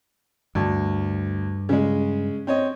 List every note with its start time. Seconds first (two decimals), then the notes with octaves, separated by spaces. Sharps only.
0.55 D2 G2
1.69 C#3 G#3
2.47 C4 C#5 D#5